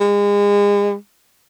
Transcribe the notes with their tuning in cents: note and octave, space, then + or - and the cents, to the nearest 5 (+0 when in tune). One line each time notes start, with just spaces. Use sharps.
G#3 -35